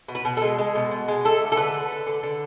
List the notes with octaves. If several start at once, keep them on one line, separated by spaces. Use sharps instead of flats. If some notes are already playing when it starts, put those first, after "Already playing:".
B2
B4
B2
A4
G#3
G#3
B2
B2
G#3
A3 A4
D3
A4
D3 B4
A3
A3
D3
D3